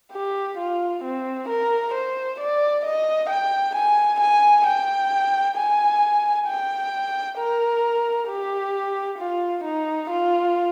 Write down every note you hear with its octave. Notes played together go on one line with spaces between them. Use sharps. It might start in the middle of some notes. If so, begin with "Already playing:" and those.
G4
F4
C4
A#4
C5
D5
D#5
G5
G#5
G#5
G5
G#5
G5
A#4
G4
F4
D#4
F4